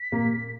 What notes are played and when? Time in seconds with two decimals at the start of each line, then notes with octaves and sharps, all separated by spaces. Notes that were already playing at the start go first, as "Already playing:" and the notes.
Already playing: B6
0.12 A#2 A#3